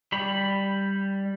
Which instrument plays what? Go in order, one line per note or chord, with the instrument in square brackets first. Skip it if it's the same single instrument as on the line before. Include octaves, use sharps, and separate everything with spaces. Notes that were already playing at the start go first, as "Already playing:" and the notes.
[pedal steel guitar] G3 B5